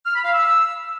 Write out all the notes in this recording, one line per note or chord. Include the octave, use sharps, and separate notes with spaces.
F6
B5
F5
E6